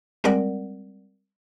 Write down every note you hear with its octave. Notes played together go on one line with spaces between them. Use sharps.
G3 G#3 C4 A#4 D5 F#5